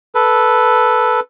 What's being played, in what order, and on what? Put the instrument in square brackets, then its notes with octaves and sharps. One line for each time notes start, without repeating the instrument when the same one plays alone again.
[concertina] A4 B4